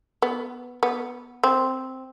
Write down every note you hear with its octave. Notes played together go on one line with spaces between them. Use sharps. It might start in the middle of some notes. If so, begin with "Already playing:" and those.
B3
B3
C4